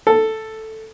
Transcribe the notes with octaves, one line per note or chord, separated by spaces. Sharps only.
A4